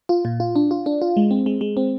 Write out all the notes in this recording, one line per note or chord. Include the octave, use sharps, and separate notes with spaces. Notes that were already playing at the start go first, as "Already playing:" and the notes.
F4
A#2
F4
D4
F4
D4
F4
G#3
C4
G#3
G#3
C4